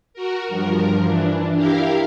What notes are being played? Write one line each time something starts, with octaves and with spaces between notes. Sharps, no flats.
F#4 A#4
G2 F3 A#4
E3 D4
E4 G4 A#4 F5